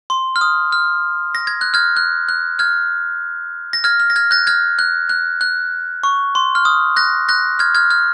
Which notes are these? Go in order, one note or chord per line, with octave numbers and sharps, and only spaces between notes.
C6
F6
D#6
F6
A#6
G#6
F#6
F6 G#6
F#6
F#6
F6 G#6
A#6
F6 G#6
F6
A#6
F6 G#6
F#6 A#6
F6 G#6
F#6
F#6
F#6
C#6
C6
F6
D#6
F#6 A#6
F#6 A#6
F6 G#6
F6 G#6
F6 G#6